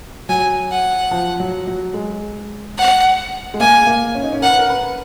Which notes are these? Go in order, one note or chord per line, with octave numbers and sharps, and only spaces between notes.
F#3 G#5
F#5
F3
F#3
F#3
G#3
F#5
G#3
A#3 G#5
A#3
C#4
D#4
C#4
A#4 F#5
B4
A#4
B4